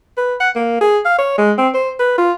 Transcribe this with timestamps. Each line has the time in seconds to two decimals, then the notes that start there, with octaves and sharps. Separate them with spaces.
0.17 B4
0.41 F#5
0.56 A#3
0.81 G#4
1.05 F5
1.18 C#5
1.38 G#3
1.58 C4
1.74 C5
2.00 B4
2.18 F4